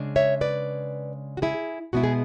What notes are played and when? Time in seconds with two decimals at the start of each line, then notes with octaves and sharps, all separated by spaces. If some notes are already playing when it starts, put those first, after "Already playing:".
Already playing: C#3 G#3 D4
0.16 C#5 E5
0.41 B4 D5
1.37 F#4
1.42 E4 G#4
1.93 B2 G#3 B3 E4 F#4
2.04 G#4